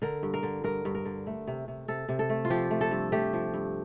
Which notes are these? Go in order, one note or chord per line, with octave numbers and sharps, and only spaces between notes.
D3 A#4
G2
A#4
D3
G2 A#4
G2
A#4
D3
A3
C3
C3
C3 A4
C3
A4
A3
F4
F3 G4
A3
A4
G2
A3 G4
F3
G2